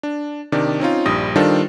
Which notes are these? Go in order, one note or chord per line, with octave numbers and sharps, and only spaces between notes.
D4
C3 D#3 D4 D5
C4 C#4 D#4 F4
A#1 G2 G3 D#6 A#6
D#3 G3 D4 F4 A4 C5